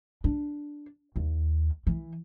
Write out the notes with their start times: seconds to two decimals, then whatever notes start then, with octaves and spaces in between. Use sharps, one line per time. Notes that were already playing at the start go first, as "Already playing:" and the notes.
0.24 D4
1.16 D#2
1.87 E3